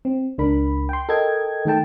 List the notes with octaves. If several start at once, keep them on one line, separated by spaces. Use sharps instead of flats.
C4
C#2 D4 A#4 B5
G5 C6
A4 A#4 D#5 G5 G#6
D#3 A3 A4 G5 A5